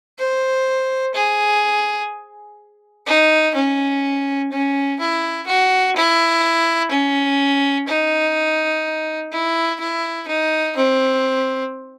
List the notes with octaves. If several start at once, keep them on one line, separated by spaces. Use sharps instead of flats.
C5
G#4
D#4
C#4
C#4
E4
F#4
E4
C#4
D#4
E4
E4
D#4
C4